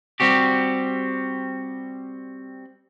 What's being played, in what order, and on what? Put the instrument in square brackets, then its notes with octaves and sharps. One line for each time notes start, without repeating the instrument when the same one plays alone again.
[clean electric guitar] G3 C4 F#4 G4